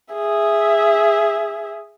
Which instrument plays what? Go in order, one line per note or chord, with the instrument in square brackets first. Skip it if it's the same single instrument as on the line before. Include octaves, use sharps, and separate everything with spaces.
[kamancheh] G#4 E5